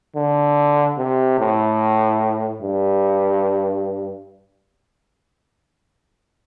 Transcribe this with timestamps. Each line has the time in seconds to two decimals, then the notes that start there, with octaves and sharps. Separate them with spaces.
0.16 D3
0.98 C3
1.39 A2
2.62 G2